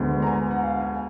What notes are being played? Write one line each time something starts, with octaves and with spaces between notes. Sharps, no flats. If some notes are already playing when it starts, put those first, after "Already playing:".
Already playing: D2 D3 G#3 B3
A#5
G#5
F#5
F5
G#5